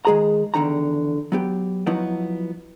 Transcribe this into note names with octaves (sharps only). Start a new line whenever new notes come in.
D#3 G#3 G#4 A#5
E2 D3 D#3 A#5
F#3 B3 G4
F3 F#3 B3 D#4 E4